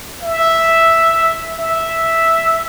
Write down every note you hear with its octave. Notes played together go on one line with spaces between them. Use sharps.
E5
E5